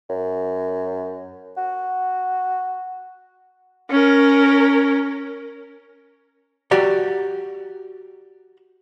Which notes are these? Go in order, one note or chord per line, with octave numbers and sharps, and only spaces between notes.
F#2
F#4
C#4 A#4
F#4 G4 D5 A#5